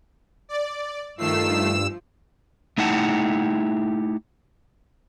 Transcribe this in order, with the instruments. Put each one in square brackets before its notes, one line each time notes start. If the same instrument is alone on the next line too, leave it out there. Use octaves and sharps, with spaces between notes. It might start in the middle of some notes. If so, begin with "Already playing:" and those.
[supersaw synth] D5
[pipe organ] G2 E6 [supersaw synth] D#3 A3 C7 [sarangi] F3
[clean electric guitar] A3 D#4 E4 G4 F#5 A5